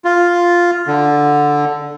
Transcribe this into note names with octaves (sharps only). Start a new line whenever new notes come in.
F4
D3